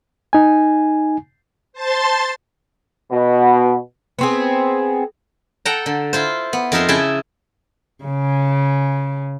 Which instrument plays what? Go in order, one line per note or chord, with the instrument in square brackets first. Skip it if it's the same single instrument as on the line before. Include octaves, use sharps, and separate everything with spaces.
[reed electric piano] D#4 G#5
[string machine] C5 A5 C6 A6
[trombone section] B2
[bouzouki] B3 C4 G#4
[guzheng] A4 F#5 G5 A5 A#5
D3
E4 F4 C5
B3
F2 D#4 F4 A#4 E5 C6
C#3 E4 G#4 E5 G5 A5
[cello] C#3